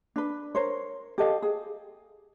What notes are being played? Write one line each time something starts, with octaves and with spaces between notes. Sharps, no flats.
D4 B4
A#4 C5 C#5
G4 A4 D#5 F5
G#4